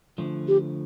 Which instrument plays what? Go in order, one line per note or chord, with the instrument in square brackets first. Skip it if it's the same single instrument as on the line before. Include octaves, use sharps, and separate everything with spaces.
[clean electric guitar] D3 F3 A3
[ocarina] G4